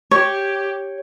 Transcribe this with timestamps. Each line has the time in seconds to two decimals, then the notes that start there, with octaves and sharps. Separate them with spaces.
0.11 G4 C#5